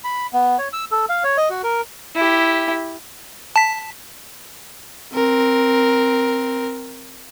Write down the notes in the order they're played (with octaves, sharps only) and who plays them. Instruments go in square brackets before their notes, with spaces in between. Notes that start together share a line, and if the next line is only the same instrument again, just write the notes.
[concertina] B5
B3
C#5
E6
A4
F5
C#5
D#5
F#4
A#4
[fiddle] E4 G4
[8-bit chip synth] A5 B6
[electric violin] C4 A#4